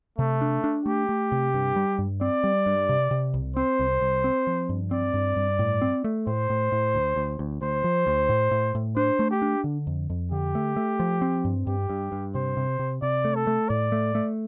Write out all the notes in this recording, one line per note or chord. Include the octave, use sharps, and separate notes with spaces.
C3 A3
D4
D4
A3 G4
A3
C3
G2
G3
G2
C4 D5
G3
G2
C3
C3
C2
C4 C5
C2
C2
C4
F3
G2
C4 D5
G2
G2
A2
C4
A3
A2 C5
A2
A2
D2
D2
D2
D2 C5
F3
D2
A2
A2
A2
D4 C5
A3
G4
D4
D3
F2
F2
D3 G4
A3
A3
F3
C4
G2
G2 G4
G2
G2
C3 C5
C3
C3
C3 D5
A3
A4
A3
A2 D5
A3
A3